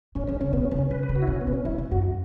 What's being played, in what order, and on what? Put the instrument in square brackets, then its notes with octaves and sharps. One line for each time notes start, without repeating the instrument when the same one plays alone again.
[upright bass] A2 [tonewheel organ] C#4
[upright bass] E2 [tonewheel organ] C#4
[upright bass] C#3 [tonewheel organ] C#4
[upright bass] B2 [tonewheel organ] B3
[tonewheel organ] C#4
[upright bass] C#3
[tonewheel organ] C#4
[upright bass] C#3 [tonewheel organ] B4
[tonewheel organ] B4
[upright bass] C#3
[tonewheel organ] F#4
E4
[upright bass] B2 [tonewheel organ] C#4
[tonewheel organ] B3
[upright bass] B2
[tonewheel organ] C#4
[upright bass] F#2 [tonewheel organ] E4
[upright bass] B2
[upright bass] F#2 [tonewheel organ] F#4